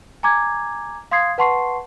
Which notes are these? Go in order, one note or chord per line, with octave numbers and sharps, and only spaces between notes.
G#5 A#5 D6 G#6
F5 C6 D#6 G#6 C7
B4 F#5 A5 C6 C#6 C7